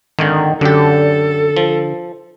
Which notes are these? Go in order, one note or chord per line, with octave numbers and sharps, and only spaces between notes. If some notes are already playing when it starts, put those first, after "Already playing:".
G#1 D3 D#3
F#2 D3 G4 A4
F3